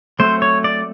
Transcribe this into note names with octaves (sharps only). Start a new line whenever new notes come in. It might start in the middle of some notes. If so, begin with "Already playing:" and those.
F#3 A3 C4 C5
C#5
D5